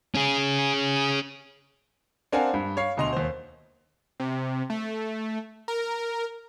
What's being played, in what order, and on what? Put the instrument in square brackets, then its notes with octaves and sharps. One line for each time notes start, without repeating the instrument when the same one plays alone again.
[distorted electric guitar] C#4 G#4
[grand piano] C4 D4 A#4 F5 F#5 G#5
G2
C#5 F5 C7
D2 B2 D#5 C6 F7
D#2 C5
[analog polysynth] C3
A3
A#4